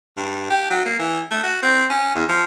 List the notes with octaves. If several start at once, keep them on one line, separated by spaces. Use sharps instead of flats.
G2
G4
F#3
A#3
E3
A3
F#4
C4
C#4
E2
F3